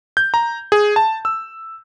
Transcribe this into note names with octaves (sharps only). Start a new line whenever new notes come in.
G6
A#5
G#4
A5
E6